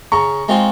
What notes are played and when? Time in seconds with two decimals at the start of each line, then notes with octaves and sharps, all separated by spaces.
0.12 C#3 A#5 C#6
0.48 G#3 C4 F4